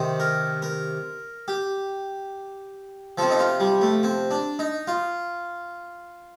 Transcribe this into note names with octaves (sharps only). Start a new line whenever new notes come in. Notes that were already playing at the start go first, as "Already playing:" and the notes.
Already playing: C3 D#3
A#4
A#4
G4
C3 F3 A4
D#4
F4
G3
A3
C4
D4
D#4
F4